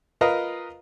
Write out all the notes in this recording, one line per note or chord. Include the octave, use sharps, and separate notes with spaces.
F4 A#4 B4 D#5 F5 A#5